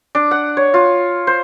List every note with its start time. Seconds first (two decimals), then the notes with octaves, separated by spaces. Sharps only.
0.15 D4
0.31 F#5
0.57 C#5
0.74 F4
1.27 C5